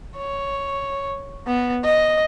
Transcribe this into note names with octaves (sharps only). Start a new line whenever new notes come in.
C#5
B3
D#5